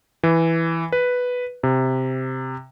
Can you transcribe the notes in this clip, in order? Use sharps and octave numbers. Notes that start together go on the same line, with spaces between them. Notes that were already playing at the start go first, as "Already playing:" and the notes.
E3
B4
C3